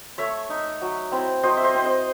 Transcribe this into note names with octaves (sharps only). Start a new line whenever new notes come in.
A3 C#5 E5
D#4
F#3
C4 E4
F#3 C5 D#5
E5
C5 D#5
C4 E4
C5 D#5